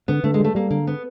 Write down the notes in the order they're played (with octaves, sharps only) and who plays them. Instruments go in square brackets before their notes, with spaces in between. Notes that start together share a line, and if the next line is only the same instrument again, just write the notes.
[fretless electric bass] D3 [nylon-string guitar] B3
[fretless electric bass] D3 [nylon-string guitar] A3
[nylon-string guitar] G#3
[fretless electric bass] G3 [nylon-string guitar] A3
[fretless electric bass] G3 [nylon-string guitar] A#3
[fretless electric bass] D3 [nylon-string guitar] A#3
[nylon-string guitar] B3